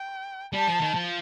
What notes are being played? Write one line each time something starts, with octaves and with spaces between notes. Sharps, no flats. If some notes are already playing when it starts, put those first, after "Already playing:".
Already playing: G5
G3 A5
F3
D#3
F3